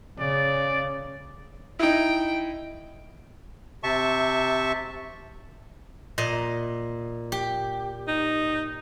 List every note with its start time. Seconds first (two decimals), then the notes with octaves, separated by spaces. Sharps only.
0.19 C#3 D5
1.79 D#4 E4 G5
3.83 C3 E5 A5 C#6
6.18 A#2 D#5
7.32 G4
8.08 D#4